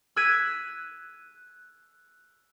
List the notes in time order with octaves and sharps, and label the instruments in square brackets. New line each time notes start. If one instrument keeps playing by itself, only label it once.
[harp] E6 F#6 G#6 B6 D#7